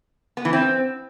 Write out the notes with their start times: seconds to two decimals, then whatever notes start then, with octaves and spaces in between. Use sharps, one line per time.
0.37 B3
0.45 E3
0.53 C4